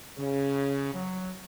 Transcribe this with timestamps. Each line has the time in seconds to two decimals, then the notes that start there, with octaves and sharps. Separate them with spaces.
0.18 C#3
0.93 F#3